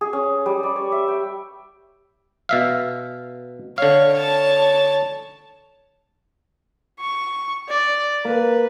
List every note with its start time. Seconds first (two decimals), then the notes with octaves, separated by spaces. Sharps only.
0.01 G#4
0.13 C#4
0.46 G3
0.63 D5
0.76 C#5
0.92 E5
1.08 G5
2.49 B2 E5 F5
3.78 D3 C#5 F5
4.14 C#5 A5
6.99 C#6
7.68 D5
8.25 A#3 B4